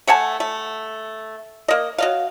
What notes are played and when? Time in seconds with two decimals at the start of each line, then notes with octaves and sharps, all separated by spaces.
0.07 A3 F#5 G#5 A5
0.40 A3
1.68 A#3 D#5
1.98 F#3 D#5 F5